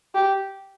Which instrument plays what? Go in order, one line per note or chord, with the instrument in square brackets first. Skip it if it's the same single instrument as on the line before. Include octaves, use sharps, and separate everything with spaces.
[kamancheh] G4